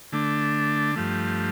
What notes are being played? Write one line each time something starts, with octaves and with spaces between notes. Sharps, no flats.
D3 A3 D4
G2 F3 A3